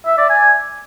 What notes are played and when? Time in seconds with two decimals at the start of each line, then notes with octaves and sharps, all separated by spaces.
0.06 E5
0.18 D5
0.30 G#5